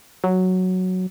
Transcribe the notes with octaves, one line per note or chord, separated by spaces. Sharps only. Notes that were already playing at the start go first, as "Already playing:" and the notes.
F#3